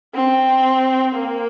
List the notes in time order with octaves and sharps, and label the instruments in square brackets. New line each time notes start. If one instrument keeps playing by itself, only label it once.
[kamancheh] C4
A#3